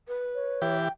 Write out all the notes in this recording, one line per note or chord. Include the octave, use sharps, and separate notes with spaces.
B4
C#5
E3 G4
G5